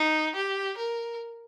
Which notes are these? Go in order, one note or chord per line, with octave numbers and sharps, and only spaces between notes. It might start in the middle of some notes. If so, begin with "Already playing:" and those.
Already playing: D#4
G4
A#4